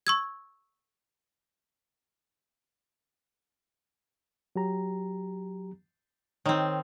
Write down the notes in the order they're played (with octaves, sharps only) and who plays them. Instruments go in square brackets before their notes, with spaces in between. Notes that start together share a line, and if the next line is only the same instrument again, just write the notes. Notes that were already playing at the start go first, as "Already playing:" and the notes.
[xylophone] C#6 E6 G#6
[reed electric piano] F#3 G4 A#5
[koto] D#3 C4 [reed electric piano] C#5